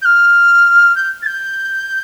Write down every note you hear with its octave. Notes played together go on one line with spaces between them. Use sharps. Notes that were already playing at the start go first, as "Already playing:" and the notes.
G6
F6
G6
A6
G6